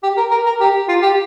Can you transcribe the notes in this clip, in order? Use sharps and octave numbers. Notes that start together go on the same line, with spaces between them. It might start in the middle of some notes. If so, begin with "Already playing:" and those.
G4
A#4
A#4
A#4
G4
F4
G4